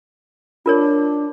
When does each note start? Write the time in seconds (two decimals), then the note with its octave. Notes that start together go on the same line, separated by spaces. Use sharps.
0.66 D4 F4 A#4 C#5